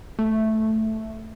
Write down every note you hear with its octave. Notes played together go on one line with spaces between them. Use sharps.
A3